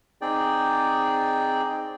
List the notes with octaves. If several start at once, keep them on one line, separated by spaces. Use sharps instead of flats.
C4 D#4 G#4 D5 G5